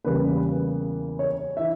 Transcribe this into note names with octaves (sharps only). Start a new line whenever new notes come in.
E2 C#3 G3 A#3 B4
C#5
E3 E5